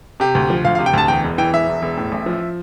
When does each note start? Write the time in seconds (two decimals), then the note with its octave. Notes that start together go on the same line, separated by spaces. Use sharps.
0.20 C3 G4
0.35 D2
0.50 F3
0.65 D2 F5
0.75 F5
0.79 C3
0.86 G5
0.94 D2 A5
1.08 E2 G5
1.24 E1
1.38 E3 G5
1.53 E1 E5
1.67 E2
1.82 E1
1.97 A2
2.12 A1
2.26 F3